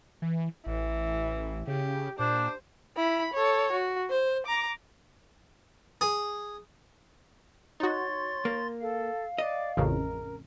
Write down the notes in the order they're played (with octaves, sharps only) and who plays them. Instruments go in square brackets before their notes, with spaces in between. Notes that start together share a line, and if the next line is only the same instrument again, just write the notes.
[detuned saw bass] E3
[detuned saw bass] A1 [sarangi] E3
[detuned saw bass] C#3 [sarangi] G4
[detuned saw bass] A#2 [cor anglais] D4 [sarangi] C5
[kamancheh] E4 B5
A4 C#5
F#4
C5
A#5 D6
[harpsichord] G#4
[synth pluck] D#4 F#4 [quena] C#5 [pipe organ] C6 A6
[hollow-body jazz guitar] A#3
[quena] A4 [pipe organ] F5
[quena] D5 [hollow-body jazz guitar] D#5
[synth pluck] A1 F2 C#3 [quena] A#4